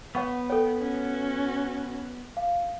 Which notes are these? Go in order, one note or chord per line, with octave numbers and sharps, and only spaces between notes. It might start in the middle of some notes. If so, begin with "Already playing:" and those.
B3 C#5 F#5 C#6
A4 C#5 G5
C#4 F#4
F5